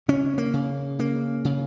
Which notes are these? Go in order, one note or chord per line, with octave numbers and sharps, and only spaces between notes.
C#3 C#4
A#3
C#3
C#3 A#3
C#3